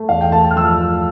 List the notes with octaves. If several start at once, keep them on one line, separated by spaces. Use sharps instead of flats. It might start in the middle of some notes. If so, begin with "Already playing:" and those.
Already playing: A3
E2 F5
G5
A3 A5
A5
F6
F3 E6
A3